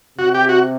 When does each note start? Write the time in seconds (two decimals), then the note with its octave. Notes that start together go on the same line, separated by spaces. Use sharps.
0.18 C3 F#4
0.34 G4
0.49 F#4